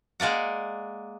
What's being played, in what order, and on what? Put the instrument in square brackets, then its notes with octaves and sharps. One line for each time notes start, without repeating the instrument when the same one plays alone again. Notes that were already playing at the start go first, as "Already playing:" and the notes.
[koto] G#3 A#3 D5 F#5